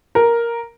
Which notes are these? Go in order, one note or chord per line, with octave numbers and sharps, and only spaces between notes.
A#4